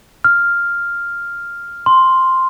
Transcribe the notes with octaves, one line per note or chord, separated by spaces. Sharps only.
F6
C6